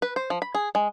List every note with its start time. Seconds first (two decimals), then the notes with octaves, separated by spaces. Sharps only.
0.02 B4
0.16 C5
0.30 F3
0.42 B5
0.55 G#4
0.75 G#3